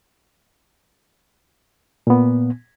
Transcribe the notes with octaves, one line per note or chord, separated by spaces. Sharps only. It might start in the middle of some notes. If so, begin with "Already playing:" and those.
A#2 B3